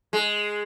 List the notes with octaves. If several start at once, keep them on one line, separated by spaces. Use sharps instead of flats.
G#3